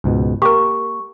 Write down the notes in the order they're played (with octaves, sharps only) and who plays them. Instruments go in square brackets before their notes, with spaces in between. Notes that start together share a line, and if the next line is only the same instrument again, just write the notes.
[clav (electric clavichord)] C#2 G#2 B2
[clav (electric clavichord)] A#3 [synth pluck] G4 A#4 [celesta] C#6